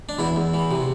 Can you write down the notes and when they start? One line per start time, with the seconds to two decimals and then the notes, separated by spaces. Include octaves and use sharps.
0.09 D4
0.19 E2 E4
0.36 E2
0.54 E3
0.71 C3